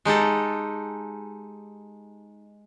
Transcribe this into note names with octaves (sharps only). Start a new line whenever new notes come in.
G#3 D#4 G4 A4